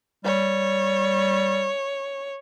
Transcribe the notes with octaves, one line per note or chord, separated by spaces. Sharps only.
G3 C#5